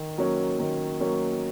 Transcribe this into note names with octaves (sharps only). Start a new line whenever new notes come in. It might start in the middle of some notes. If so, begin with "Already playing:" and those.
Already playing: D#3
F#3 A#3 C#4
D#3
F#3 A#3 C#4